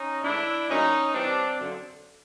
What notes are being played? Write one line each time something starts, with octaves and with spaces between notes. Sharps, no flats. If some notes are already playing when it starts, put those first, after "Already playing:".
Already playing: C#4 D#4
G#2 E3 A3 D4 E4
A2 F#3 A#3 C#4 D#4
C3 E3 G3 C4 D4
F#2 D3 F3